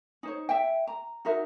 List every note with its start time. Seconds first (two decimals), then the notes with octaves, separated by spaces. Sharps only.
0.23 D#4 C5 C#5
0.49 E5 G5
0.87 A#5
1.25 D#4 F#4 A#4 E5